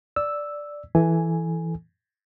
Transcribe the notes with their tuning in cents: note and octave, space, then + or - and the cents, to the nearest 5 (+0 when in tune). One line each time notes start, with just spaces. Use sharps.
D5 +0 E6 +0
E3 +0 A4 -15 G#5 +0